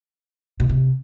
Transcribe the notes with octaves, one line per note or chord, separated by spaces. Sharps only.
B2
C3